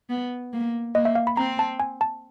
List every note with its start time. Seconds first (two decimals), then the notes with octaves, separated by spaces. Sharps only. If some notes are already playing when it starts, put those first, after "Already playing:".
0.09 B3
0.53 A#3
0.95 A#3 D#5
1.05 E5
1.15 F5
1.27 B5
1.37 C4 A#5
1.59 A5
1.80 G#5
2.01 A5